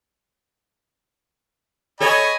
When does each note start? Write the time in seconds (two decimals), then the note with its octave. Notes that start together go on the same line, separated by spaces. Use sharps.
2.00 A4 C#5 D#5 G#5 B5